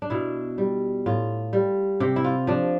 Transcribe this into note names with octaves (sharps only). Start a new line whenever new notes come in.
D4
B2 E4
G3
A2 F4
G3
C3 G4
E4
F4
F3 D4